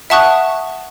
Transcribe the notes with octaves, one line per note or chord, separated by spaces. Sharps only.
E5 F#5 A5 C#6 D#6 F#6